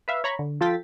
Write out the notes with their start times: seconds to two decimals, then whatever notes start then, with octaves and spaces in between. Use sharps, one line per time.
0.08 B4 E5 F5
0.24 C#5 A#5 B5 C#6
0.39 D3
0.61 F3 F4 A4 G5 A6 B6